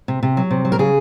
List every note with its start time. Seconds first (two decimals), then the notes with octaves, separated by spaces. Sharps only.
0.08 C3
0.23 C3
0.37 F#3
0.51 C3
0.65 F#3
0.72 A#4
0.79 C#3 G#4